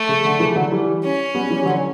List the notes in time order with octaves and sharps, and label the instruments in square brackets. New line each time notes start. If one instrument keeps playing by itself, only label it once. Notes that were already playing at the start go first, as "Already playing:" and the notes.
Already playing: [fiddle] A3
[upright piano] C#3
D3
C#3 E3
D3 F#3
E3 G3
[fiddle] C#4
[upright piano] G3 B3
E3 G3
D3 F#3